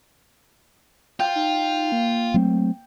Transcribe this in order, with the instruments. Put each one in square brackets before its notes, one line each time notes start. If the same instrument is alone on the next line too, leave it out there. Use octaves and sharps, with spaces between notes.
[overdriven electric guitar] F4 [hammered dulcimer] G5
[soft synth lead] D#4
A#3
[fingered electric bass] F#3 A3 C4